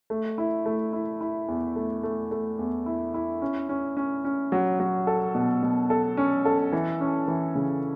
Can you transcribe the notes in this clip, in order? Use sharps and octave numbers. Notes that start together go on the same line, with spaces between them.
A3
E4
A3
E4
E4
E2
A3
A3
A3
E2
E4
E4
C#4
C#4
C#4
C#4
F#3
F#3
A4
B2
B2
A4
C#4
A4
E3
C#4
E3
C#3